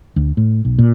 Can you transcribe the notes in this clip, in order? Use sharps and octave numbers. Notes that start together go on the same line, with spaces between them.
D2
A2
B1
A#2